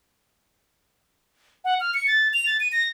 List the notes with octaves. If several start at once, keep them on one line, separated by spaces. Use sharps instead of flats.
F#5
F6
C#7
A6
F7
A6
D#7
A#6